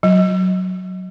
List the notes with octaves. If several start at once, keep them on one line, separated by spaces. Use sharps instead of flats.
F#3